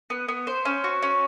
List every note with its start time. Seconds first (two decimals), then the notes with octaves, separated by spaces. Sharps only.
0.10 B3
0.28 B3
0.47 C5
0.65 C#4
0.84 F#4
1.02 C#4